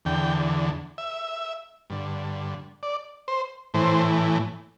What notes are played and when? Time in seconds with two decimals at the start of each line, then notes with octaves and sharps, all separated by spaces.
0.05 E2 D3 G5
0.98 E5
1.90 G2 D3
2.83 D5
3.28 C5
3.74 A2 E3 C5